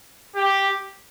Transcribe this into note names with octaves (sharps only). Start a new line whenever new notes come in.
G4